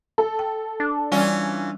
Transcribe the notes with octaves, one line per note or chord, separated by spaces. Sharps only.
A4
G5
D4
E3 G3 C#4 F4